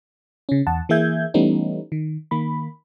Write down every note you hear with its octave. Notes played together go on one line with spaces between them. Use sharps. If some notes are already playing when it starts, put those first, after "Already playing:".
C#3 C#4
E2 F#5 A5
E3 A#3 G#4 E5 G6 G#6
E3 G3 A3 B3 C#4 D#4
D#3
D#3 A#3 B5